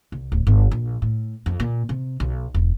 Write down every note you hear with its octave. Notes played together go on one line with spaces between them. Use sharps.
C2
D1
G1
A#1
A2
F2
A#2
C3
B1
E1